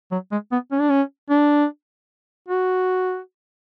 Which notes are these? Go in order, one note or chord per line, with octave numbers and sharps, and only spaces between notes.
F#3
G#3
B3
C#4
D4
C#4
D4
F#4